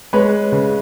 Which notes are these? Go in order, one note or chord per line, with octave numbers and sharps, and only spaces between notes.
G#3 B4 C#5
C#3